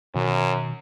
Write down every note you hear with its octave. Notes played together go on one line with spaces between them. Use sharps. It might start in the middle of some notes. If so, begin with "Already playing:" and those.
F#2 B2 D#3